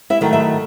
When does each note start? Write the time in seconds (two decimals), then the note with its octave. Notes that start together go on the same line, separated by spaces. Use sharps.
0.10 E4 E5
0.21 D#3 F#3 A3
0.33 E4 E5